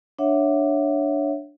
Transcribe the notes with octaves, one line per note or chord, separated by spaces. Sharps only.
D4 C#5 E5 F#5